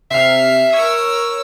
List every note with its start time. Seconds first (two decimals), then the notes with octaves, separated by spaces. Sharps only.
0.11 C3 E5 F6 C7
0.73 A#4 C#5 C#6 E6